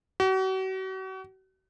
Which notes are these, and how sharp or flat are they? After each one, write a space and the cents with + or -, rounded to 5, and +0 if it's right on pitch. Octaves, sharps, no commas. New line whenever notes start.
F#4 +40